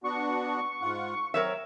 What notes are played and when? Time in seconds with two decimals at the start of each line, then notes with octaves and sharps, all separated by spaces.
0.04 B3 D4 F#4 C#6
0.82 G#2 F4 F#5
1.34 F#3 C4 A#4 C#5 E5